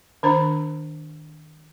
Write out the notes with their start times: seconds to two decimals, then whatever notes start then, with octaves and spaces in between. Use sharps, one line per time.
0.23 D#3 D4 C5 A#5